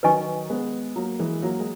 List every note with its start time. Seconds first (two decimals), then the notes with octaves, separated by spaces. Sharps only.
0.03 D#3 F#3 B4 D#5 G#5 C#6
0.50 G#3 B3
0.96 F#3 A#3
1.19 E3 G#3
1.42 F#3 A#3
1.60 G#3